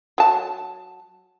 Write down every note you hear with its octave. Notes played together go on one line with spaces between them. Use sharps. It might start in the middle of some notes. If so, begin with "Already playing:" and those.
F#3 A5